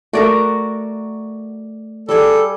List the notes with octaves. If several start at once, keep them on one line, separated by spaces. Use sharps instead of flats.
A3 F#4 A#4 D5 A#5
G3 G#4 A4